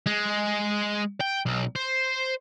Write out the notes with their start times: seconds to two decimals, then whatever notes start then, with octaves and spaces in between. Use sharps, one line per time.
0.06 G#3
1.21 G5
1.46 B1
1.76 C5